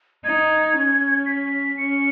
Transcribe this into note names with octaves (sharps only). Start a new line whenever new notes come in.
D#4 G#6
C#4
B6
C#4 C#7